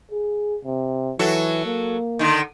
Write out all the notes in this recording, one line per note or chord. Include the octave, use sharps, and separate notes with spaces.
G#4
C3
E3 F#3 F#4 A4
A#3
D3 D#3